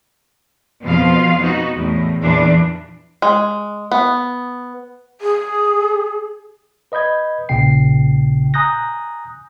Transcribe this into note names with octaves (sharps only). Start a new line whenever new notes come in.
F2 B2 F3 F4 F5
B3 D#4 F#4
E2 A2
E2 A#2 E3 D4
G#3
B3
G#4
B4 D#5 B5 G6 G#6
A#1 A#2 C#3 G5 C7
G#5 A#5 D#6 F#6 G6 A#6